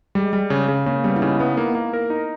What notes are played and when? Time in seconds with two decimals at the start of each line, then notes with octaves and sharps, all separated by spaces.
0.15 G3 G#3
0.33 G3
0.50 C#3
0.68 C#3
0.86 C#3 A#3
1.04 G3 B3
1.16 E4
1.21 C#3 D#4
1.39 B3 E4
1.57 A#3 D#4
1.75 A#3
1.93 A#4
2.10 D#4